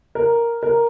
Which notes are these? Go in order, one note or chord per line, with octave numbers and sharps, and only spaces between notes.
A#4
A#4